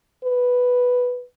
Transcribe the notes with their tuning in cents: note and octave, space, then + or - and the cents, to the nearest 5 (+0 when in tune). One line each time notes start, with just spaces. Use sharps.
B4 +0